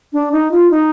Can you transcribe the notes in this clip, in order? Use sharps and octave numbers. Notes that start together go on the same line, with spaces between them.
D4
D#4
F4
D#4